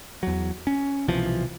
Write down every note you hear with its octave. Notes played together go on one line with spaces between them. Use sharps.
E2 F#3
C#4
C2 B2 E3 F3